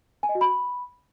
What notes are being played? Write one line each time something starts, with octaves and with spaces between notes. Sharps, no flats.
G#5
D#5
F#4
B5